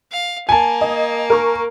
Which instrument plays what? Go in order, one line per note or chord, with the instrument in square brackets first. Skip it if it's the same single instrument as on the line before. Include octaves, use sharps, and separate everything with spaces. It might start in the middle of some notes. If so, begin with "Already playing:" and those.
[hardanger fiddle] F5
[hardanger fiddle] A#3 [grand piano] G#5 A5
[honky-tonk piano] D#5
A#4 C#6